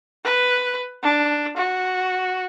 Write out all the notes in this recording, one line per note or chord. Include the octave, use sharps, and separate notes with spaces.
B4
D4
F#4